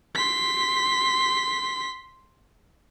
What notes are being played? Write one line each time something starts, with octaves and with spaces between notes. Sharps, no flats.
C6 B6